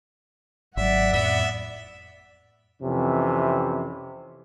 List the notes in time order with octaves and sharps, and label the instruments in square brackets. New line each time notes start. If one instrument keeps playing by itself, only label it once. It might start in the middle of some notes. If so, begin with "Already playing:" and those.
[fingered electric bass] G#1 F#3 [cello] D5 F#5 [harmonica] E5
[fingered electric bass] F2 A2 [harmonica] B3 E5
[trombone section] F2 C3 E3 C#4